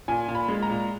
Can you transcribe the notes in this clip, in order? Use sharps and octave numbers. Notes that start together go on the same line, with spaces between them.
A#2 G#5
A#2
B5
G#3
A#5
A#2